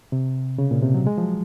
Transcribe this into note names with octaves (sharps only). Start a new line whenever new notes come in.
C3
C#3
A#2
C3
F#3
G#3
F3
F#3